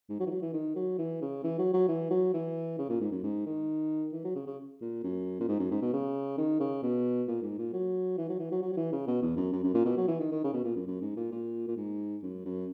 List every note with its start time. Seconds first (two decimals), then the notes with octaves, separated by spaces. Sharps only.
0.09 G#2
0.20 F#3
0.26 E3
0.30 F#3
0.42 E3
0.53 D#3
0.76 F#3
0.98 E3
1.21 C#3
1.44 E3
1.58 F#3
1.73 F#3
1.88 E3
2.10 F#3
2.34 E3
2.78 C#3
2.89 A#2
3.00 G#2
3.11 F#2
3.23 G#2
3.46 D#3
4.12 E3
4.24 F#3
4.35 C#3
4.46 C#3
4.81 A#2
5.03 F#2
5.40 A#2
5.48 G#2
5.59 F#2
5.71 G#2
5.82 B2
5.93 C#3
6.37 D#3
6.60 C#3
6.82 B2
7.27 A#2
7.42 G#2
7.58 A#2
7.73 F#3
8.18 E3
8.29 F#3
8.39 E3
8.51 F#3
8.62 F#3
8.72 F#3
8.77 E3
8.92 C#3
9.07 B2
9.22 E2
9.37 F#2
9.53 F#2
9.63 F#2
9.74 A#2
9.85 B2
9.97 F#3
10.08 E3
10.20 D#3
10.31 D#3
10.44 C#3
10.54 B2
10.64 A#2
10.76 F#2
10.87 F#2
11.01 G#2
11.16 A#2
11.32 A#2
11.68 A#2
11.76 G#2
12.22 F#2
12.45 F#2